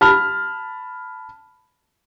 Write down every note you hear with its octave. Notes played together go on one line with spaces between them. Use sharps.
A5 B5 F6